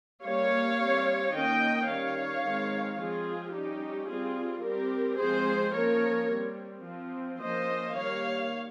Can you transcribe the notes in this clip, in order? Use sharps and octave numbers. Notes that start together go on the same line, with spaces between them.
G3 A#3 C#4 C#5 F5
G3 C4
D#3 A#3 C#4 D#5 G5
D#3 G3 C#4 C#5 F5
D#3 G#3 C4
F3 G#3 C4 F4 G#4
G3 C#4 D#4 G4
G3 C4 F4 G#4
G3 C4 G4 A#4
F3 G#3 C4 G#4 C5
F3 A#3 C#4 A#4 C#5
G3 C4
F3 C4
F3 A#3 C#4 C5 D#5
D#3 G3 A#3 C#5 F5